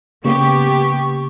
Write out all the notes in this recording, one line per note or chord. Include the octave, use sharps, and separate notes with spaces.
C#3 A#3 B3 G4 C#6